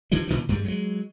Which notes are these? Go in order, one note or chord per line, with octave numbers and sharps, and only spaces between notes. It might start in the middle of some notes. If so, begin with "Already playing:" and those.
D3 E3 F3 G3
A#2 D3 E3 F3
G2 G3 G#3
F#3 G#3